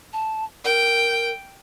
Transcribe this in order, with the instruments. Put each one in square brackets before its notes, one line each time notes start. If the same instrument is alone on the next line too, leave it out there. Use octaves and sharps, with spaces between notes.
[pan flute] A5
[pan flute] A#4 [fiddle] G5